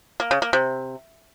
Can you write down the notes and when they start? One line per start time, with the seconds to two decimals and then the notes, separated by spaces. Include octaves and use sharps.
0.20 A#3
0.31 C#3
0.42 A#3
0.53 C3